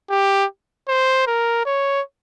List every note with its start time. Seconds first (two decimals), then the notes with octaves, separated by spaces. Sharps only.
0.10 G4
0.88 C5
1.27 A#4
1.66 C#5